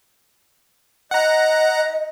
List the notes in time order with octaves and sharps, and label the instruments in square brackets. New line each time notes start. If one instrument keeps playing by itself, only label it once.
[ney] D#5 [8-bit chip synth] F#5 A#5